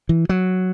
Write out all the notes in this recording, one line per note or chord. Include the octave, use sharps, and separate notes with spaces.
E3
F#3